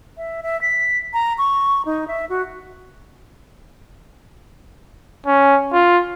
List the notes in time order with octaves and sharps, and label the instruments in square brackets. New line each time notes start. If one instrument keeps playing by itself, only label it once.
[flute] E5
E5
B6
A#5
C#6
D#4
E5
F#4
[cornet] C#4
F4